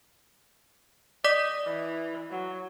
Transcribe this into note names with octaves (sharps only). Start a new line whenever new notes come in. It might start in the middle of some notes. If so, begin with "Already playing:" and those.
D5 D#5 D6 B6
E3
F#3